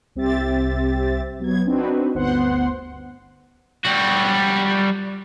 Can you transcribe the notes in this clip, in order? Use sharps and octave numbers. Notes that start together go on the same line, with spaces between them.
C2 C4 G4 E5 A6
F#3 B3 G#6
C4 D4 D#4 F#4 B4
G1 D2 B3 C5 F#5 C6
G3 F#4